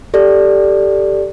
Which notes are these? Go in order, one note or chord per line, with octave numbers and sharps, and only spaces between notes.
G4 A4 D5